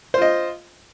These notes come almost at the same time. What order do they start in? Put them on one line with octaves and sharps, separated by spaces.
C5 F4 D#5